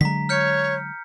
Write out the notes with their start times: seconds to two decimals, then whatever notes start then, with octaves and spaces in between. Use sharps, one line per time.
0.01 D3 F#3 G#3 A#5 B6
0.29 C#5 F6 G6 C#7